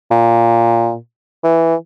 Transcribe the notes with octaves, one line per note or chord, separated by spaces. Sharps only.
A#2
E3